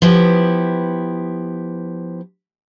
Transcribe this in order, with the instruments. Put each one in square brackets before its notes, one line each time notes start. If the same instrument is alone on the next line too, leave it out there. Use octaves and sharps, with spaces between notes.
[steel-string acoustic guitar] F3 B3 E4 G4